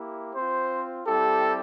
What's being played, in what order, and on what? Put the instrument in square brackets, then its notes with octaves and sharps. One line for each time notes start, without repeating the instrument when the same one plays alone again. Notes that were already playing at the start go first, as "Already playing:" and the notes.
Already playing: [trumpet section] A#3 E4 G4
C4 F4 C5
G3 C4 E4 G4 A4